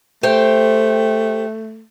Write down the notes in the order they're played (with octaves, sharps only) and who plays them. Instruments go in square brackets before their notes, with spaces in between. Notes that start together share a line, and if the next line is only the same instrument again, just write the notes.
[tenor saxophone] A3 [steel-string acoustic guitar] G4 C5 G5